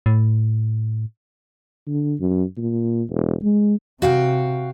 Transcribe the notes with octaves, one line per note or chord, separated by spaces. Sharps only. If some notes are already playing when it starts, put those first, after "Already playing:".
A2
D3
F#2
A#2
E1
G#3
C3 F#4 F5 G5